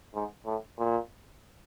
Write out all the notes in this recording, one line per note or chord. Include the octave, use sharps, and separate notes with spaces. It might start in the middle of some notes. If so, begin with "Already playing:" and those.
G#2
A2
A#2